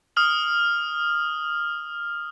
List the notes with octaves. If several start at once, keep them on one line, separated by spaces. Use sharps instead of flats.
D#6 F6 F#7